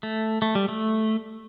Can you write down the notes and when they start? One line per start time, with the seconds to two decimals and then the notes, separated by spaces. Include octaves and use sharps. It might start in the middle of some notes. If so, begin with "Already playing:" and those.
0.03 A3
0.42 A3
0.55 G3
0.68 A3